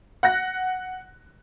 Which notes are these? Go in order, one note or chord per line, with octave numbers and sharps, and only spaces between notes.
F#5 F#6 A#6